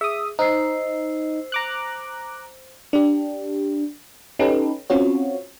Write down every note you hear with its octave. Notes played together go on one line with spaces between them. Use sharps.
G#4 E5 D#6
D#4 C5 E6 C7
A#5 D6 F#6
D4 G4
C#4 D#4 G4 A4 B4
C4 C#4 F4 F#4 C#5